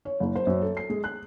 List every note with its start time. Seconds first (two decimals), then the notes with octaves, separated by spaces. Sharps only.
0.05 C#5
0.20 F#1
0.35 C5
0.47 F#2
0.62 A4
0.77 C7
0.90 G#3
1.04 F#6